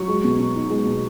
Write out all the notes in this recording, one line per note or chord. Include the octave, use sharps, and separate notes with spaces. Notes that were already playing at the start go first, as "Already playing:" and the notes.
Already playing: F#3 C#6
G#3
B2
B2
D#4
G#3
B2